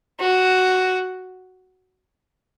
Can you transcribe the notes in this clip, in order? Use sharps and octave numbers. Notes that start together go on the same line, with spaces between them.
F#4